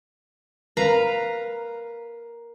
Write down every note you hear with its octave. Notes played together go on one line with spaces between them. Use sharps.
A#4 B4 F5 A#5